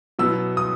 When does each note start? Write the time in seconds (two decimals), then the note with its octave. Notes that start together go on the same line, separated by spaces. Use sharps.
0.19 B2 F#3 B3 E4 E6
0.57 D#6